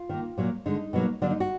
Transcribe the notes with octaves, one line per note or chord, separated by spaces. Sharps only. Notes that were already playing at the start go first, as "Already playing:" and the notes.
Already playing: F4
D#3 A#3
A#2 F#3 A#3
D3 G#3 D#4
B2 F#3 A#3
D3 F#3 A#3 D4
D#4
F#4